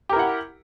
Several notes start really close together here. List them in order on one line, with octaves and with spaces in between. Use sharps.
G4 A#4 E4 F#5